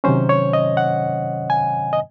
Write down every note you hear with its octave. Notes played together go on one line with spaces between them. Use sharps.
C3 D#3 F#3 C#4 C5
C#5
D#5
F#5
G#5
D#5